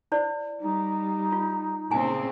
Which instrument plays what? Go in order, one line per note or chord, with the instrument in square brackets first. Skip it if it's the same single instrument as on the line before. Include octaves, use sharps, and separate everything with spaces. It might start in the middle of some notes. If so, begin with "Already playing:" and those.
[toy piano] E4 C5 D5
[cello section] G3 [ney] D#4
[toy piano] F4
[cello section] A#2 C#3 C4 [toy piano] E4 G#5